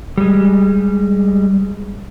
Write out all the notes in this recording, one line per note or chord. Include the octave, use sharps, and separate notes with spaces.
G3 G#3